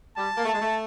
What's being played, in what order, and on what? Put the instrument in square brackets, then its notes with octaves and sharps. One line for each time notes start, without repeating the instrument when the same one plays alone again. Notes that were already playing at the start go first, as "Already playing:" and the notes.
[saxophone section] G3 [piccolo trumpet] A5
[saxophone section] A#3
A3
[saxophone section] G#3 [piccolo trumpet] A5
[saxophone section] A3